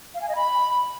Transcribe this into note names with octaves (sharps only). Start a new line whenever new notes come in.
F5
G#5
D#5
B5